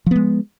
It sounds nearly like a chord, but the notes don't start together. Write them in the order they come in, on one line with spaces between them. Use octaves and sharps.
F3 B3 G#3